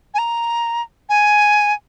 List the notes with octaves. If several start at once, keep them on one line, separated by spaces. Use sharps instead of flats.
G#5
A#5
G#5